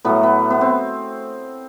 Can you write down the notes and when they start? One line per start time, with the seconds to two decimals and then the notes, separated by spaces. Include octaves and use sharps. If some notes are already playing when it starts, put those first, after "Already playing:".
0.05 A2 F#3 A3 B3
0.23 B3
0.50 B3
0.61 C4